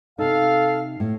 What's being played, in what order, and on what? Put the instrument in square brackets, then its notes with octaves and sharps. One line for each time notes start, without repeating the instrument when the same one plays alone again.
[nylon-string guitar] C3 D#4 [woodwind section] A4 F5
[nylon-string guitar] A2